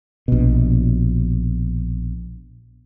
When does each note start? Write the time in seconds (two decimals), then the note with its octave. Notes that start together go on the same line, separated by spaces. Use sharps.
0.28 A#1 B2